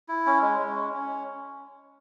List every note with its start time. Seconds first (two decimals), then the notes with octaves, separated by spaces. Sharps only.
0.08 E4
0.26 C#4
0.42 G#3
0.59 G#3
0.75 C#4
0.93 C#4